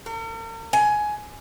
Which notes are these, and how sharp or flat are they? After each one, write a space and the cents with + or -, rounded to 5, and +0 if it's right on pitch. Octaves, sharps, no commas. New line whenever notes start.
A#4 -45
G#5 +15